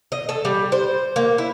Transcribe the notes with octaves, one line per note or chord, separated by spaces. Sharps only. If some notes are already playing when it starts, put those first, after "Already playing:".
D#5
A4
G3
C5
A#3
E4